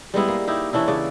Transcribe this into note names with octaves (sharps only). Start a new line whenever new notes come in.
G3 G#3 B3 E4
A#3
D#4 E4 G4
E3 C#4 D4 E4
C#3 D5